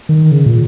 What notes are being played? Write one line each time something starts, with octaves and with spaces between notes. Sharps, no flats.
D#3
C#3
A#2